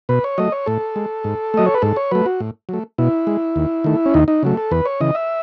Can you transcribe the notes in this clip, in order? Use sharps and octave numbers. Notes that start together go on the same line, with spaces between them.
B2 B4
C#5
F#3 A3 D#5
C#5
A2 A4
G#3
G#2
F#3 A3 D#5
C#5
B4
G#2 A4
C#5
F#3 A3 B4
F#4
A2
F#3 A3
B2 E4
G#3
D#2
D#3 A3
C#4
D#2 D#4
D#4
C#3 F#3 A3
A4
E2 B4
C#5
C#3 E3 D#5
E5